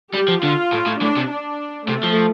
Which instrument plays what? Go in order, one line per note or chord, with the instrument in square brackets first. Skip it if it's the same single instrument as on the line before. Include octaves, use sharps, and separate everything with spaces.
[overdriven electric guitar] G3 [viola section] G4
[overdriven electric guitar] F3
[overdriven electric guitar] D3 [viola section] F4
[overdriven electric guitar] A2
A2
[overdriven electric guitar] A2 [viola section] D4
[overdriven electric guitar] C3
[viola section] D4
[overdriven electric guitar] C3 [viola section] A3
[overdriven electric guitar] F3